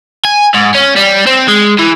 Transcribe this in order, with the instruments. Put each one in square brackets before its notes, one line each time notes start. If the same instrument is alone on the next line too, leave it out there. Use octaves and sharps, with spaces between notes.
[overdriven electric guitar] G#5
G#2
C#4
G3
C4
G#3
E3